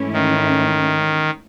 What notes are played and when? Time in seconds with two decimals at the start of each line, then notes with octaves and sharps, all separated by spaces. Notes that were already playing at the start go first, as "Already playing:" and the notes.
Already playing: G#2 E3 A3 C#4 E4
0.13 D#3